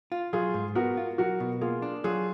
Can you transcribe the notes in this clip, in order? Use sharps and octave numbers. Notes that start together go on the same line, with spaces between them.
F4
F#3 F4 G#4
G#2
B3 F#4 A#4
F4
F#3 F#4 A#4
B2
A#3 F4 G#4
D4
F#3 F4 G#4